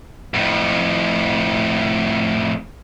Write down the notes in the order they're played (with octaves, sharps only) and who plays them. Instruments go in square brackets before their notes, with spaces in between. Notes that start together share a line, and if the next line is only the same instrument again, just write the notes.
[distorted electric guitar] F2 A2